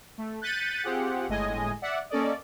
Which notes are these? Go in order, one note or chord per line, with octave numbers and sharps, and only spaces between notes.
A3
F#6 G6 A6 B6 C#7 D#7
C4 F4 G4 G#4 F#5
G1 A2 G#3 D#5 G#5
D5 E5 F#5
A#3 C#4 A4 D5 D#5